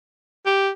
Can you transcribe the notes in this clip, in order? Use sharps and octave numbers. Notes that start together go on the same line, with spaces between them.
G4